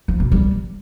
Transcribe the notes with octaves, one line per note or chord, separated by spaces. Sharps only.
F3
B2
G3